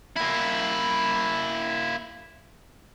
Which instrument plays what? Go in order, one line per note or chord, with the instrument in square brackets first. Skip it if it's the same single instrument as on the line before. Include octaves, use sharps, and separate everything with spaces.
[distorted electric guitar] A#3 E4